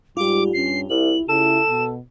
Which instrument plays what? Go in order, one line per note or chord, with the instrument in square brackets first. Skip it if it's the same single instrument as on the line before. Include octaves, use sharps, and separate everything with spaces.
[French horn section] G#2 G3 [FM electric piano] F4 G4 [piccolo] D6
[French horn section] G2 C#4 [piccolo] C7
[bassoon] C2 [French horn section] E4 [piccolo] F#7
[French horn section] C#3 E4 [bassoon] A4 [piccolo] E7
[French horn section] B2